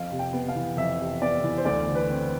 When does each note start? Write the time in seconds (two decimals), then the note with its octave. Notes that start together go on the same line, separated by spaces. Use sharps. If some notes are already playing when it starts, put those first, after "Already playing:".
Already playing: F2 F5
0.11 C3
0.19 G5
0.33 B3
0.48 F5
0.55 E3
0.77 F2 E5
1.00 C3
1.21 B3 D5
1.44 E3
1.58 C5
1.65 D2 D5
1.88 D3
1.95 B4
2.10 C4